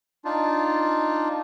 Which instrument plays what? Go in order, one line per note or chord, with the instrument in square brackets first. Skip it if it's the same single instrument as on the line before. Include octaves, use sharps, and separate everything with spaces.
[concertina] D4 D#4 F4